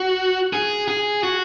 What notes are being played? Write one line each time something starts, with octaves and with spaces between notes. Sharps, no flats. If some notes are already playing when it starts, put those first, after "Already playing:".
Already playing: F#4
G#4
G#4
F#4